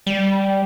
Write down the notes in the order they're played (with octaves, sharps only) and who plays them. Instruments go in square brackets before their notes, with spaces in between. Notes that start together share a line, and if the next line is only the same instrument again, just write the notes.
[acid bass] G3